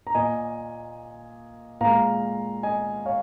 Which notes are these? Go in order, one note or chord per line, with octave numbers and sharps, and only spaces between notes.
A#5
A#2 A#3 D#5 G#5
A#2 G#3 F5 A#5
D#5 G#5
C#5 F5